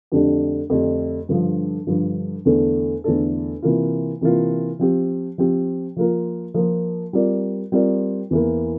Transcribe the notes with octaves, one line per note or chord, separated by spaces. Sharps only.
F2 D3 A3 D4 G4
F2 D3 A3 D4 G4
G2 D3 F3
G2 D3 F3
E2 D3 A3 D4 A4
E2 D3 A3 D4 A4
C3 E3 A#3 F4
C3 E3 A#3 F4
F3 C4 G4
F3 C4 G4
F3 A#3 F4 A#4
F3 A#3 F4 A#4
G3 C4 F4 A#4 D5
G3 C4 F4 A#4 D5
E2 E3 A#3